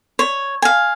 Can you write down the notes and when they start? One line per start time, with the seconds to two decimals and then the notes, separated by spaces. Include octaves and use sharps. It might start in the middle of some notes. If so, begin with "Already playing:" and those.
0.19 C#5
0.62 F5 G#5